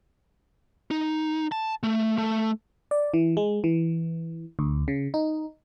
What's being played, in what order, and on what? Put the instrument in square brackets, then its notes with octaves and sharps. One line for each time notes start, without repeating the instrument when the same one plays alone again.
[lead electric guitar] D#4
A5
A3
A3
[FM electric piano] D5
E3
G#3
E3
D2
C#3
D#4